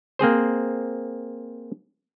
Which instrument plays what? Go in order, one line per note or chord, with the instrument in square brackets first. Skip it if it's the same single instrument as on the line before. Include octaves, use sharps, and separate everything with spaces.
[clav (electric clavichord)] A#3 C4 G#4 C5